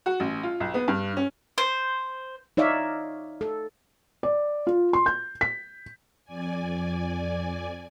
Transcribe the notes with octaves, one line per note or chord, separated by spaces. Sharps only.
F#4
A1
F4
B1
B3
G2
C#4
C5
D#4 C#5 D5 E5 F5
A4
D5
F4
C6
G6
B6
F2 D5 G#5